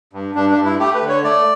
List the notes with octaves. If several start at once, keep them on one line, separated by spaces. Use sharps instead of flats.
G2
G2 D4
D4
G2
E4
A3 G4
B4
D3
C#5
A3 D5